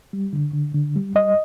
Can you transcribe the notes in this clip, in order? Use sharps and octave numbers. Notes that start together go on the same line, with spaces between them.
G3
D3
D3
D3
G3
G3 D#5